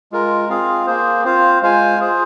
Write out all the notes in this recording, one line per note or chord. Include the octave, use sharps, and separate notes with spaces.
G#3 F4 A#4
C4 F4 G#4 F5
A#3 G#4 C5
C4 F4 C5 F5
G#3 F4 C5 F5 G#5
F4 G#4 C5